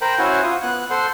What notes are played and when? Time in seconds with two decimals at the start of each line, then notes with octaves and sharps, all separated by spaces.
0.01 A#4 C5 G5 A#5 B5
0.19 C#4 E4 F#4 C5 F#5 G#5
0.43 F4 D#6
0.63 B3 F#6
0.90 A4 C5 F#5 C6